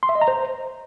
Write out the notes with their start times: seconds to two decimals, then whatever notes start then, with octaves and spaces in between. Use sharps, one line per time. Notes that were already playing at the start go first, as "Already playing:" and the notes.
0.03 C6
0.09 E5
0.15 D#5
0.21 A#5
0.28 C5